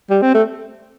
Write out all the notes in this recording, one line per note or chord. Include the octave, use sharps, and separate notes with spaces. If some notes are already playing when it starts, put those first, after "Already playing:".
G3
C4
A3